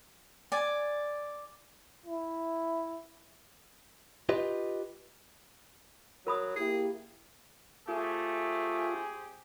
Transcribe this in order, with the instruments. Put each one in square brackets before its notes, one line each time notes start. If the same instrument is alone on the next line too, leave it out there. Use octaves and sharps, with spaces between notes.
[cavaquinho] D5 G#5
[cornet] E4
[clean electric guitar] F4 G4 B4 D#5
[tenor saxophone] F#3 [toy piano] A#4 B5 D#6
[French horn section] A#3 E4 G4 [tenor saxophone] G#4
[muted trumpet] A3 [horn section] C4 G4 G#4 [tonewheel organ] F4